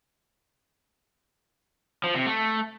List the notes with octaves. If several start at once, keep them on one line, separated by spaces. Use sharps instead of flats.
F3
C3
A3